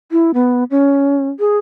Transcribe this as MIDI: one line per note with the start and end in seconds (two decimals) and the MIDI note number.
0.11 0.31 64
0.34 0.64 59
0.70 1.29 61
1.39 1.58 68